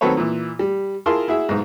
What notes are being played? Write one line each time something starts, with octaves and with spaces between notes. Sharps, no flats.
D#3 F#3 C4 A4 B4 C#5
A#2 E3
G3
E4 F4 G#4 A#4 A5 C6
E4 F#4 G#4 E5
B1 G#2